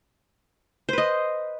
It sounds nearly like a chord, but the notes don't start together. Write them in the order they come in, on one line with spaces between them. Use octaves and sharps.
C5 B4 D#5